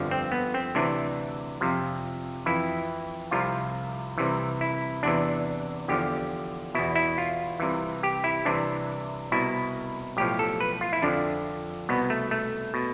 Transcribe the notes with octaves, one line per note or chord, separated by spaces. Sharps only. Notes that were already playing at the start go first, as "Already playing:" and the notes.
Already playing: G1 F2 D3 F3
C4
B3
C4
D2 C3 E3 D4
F2 C3 F3
F2 E3 E4
C2 C3 F3 F4
C2 C3 E3
E4
E2 C3 E3 D4
E2 D3 F3 G4
E2 B2 E4
E4
F4
C2 C3 E3
G4
E4
C2 C3 E3 D4
C2 B2 E4
B1 A2 F3 G4
A4
B4
F4
E4
F2 D3 F3 D4
C2 B2 B3
A3
A3
B2